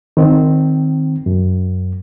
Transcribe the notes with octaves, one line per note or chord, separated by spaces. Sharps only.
D#3 C4
F#2